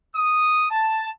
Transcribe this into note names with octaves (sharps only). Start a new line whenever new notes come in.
D#6
A5